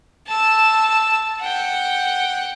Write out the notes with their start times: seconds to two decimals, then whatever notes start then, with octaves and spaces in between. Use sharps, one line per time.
0.28 A5 E6
1.41 F#5 G5